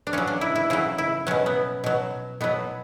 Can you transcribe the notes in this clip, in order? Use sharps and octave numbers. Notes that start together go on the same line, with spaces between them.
D4
C#3 F#3 C#4
D4
E4
E4
C#3 F#3 E4
E4
B2 F#3 C#4
B3
B2 F#3
B2 F#3 B3